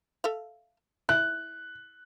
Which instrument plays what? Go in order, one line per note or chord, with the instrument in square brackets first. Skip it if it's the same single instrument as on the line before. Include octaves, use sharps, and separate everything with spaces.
[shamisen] A4 E5 F5
[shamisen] E4 [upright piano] F#6